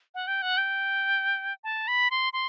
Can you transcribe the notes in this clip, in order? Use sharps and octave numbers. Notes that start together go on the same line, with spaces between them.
F#5
G5
F#5
G5
A5
B5
C6
C6